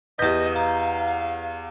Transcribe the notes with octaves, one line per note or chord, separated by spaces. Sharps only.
E2 G4 B4 D#5 G6
F5 A#5